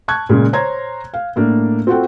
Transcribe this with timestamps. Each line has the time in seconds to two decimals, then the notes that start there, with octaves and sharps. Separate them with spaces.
0.08 A5 C#6 F#6 G#6
0.29 A#2 C#3 G#3
0.53 C5 C#5 A#5 C6 G#6
1.14 F5
1.36 A2 A#3 D4
1.87 C4 F4 F#4 A4 F#5 G5